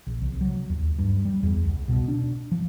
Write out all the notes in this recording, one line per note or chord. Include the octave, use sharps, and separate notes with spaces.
A#1
C2
F#3
D#2
G2
G3
E2
C2
B2
D4
F3